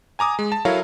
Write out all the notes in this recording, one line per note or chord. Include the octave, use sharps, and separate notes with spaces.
G#5 A#5 D6 D#6
G#3
A5
F#3 E4 A4 A#4 C#5 F5